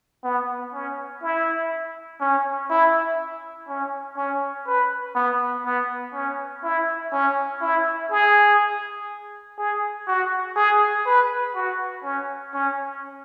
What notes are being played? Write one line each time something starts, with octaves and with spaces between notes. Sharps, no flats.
B3
C#4
E4
C#4
E4
C#4
C#4
B4
B3
B3
C#4
E4
C#4
E4
G#4
G#4
F#4
G#4
B4
F#4
C#4
C#4